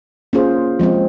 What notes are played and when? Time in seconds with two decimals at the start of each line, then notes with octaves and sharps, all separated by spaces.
0.33 A#3 C#4 F4 G#4 C5
0.79 F3 G#3 C4